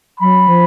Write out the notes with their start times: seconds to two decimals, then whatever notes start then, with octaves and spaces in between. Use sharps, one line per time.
0.20 F#3 B5
0.48 F3